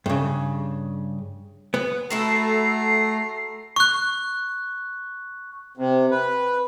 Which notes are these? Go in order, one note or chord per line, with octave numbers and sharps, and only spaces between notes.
G2 C#3
B3
A3 E4 F#4 A4 A#5 C7
C#6 F#6
C3
B4